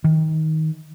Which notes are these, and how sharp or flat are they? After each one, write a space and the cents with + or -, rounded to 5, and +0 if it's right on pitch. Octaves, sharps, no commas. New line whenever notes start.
D#3 +20